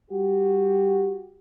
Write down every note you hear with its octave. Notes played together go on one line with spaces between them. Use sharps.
G3 F#4 G4